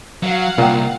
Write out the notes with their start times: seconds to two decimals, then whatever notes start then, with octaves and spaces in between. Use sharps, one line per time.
0.23 F#3 F5 F#5
0.58 C2 A#2 A#4 G5